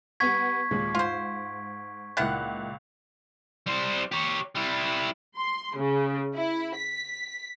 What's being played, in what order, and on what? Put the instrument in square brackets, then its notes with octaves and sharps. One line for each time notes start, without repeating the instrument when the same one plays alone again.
[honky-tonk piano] G3 B3 F#5 [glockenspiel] C#6 G#6 B6
[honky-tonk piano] D#2 A#2 G#3
[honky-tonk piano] G#2 [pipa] F4 C5
[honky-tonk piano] C#2 A#2 F#6 [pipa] D#3 E4 F#5
[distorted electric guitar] G3 C5
G4 C#5
G3 E4
[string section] C6
C#3
E4
B6